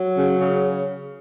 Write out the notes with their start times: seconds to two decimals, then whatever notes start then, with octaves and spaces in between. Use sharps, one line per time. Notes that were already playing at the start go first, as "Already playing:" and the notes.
Already playing: F#3
0.17 C#3
0.40 C#3